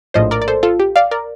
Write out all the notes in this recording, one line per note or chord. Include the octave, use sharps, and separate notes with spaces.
A#1 A2 F3 C5 D#5
A#4 D5
D5
A4 C5
F4 A4
G4
D5 F5
A#4 D5